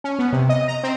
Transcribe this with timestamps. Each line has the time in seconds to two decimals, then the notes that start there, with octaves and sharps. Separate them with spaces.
0.04 C#4
0.19 B3
0.33 C3
0.49 D#5
0.68 A#5
0.83 C4